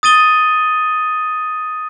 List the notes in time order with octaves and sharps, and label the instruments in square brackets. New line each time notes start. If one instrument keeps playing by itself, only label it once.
[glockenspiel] D#6 A6 D#7 G7